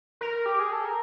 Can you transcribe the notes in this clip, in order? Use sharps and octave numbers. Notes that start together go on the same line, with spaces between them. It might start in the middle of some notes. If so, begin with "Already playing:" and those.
A#4
G4
G#4
A4
A#4